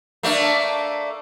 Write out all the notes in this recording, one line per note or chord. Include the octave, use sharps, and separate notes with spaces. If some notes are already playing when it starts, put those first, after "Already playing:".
A3 A#3 D4